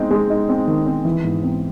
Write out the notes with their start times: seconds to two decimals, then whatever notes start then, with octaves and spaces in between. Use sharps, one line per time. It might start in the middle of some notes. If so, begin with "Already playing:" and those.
Already playing: G#3 C4 D#4
0.11 G#3
0.30 D#4
0.49 C4
0.67 D#3
0.86 C4
1.05 E3
1.24 G#2
1.43 C4